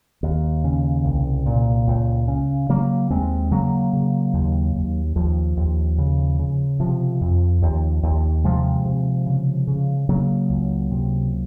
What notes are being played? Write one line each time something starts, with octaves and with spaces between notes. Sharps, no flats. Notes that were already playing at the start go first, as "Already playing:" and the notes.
D#2
C#3
C2
A#2
C#2
C#3
C#3 F#3 A#3
D#2 G#3 C4
C#3 F#3 A#3
C#3
D#2
D#2
D#2 F3
D#2
C#3
C#3
C3 F3
F2
D#2
D#2
C3 F3 G#3
C3
C#3
C#3
C#3 F#3 A#3
C#2
C3